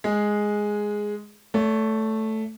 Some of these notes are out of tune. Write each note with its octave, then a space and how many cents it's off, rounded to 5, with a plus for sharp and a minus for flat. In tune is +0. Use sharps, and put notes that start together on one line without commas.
G#3 +0 G#4 +0
A3 +0 C#5 +45